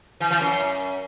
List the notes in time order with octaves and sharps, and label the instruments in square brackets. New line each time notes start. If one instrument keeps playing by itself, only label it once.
[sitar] E3
E3
F#2